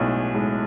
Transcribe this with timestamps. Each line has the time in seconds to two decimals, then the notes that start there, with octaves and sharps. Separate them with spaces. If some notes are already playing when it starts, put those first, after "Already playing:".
Already playing: B1 A2 G#3
0.34 A2 G#3